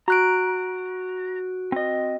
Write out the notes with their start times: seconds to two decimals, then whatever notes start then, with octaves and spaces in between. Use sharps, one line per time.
0.08 F#4 A#5 F#6 D7
1.72 C4 D#5